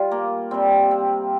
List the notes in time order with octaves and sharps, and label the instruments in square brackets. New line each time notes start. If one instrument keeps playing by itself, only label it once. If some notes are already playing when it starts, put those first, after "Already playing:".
Already playing: [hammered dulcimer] G3 F4
A#3
C3 G3 C4
C4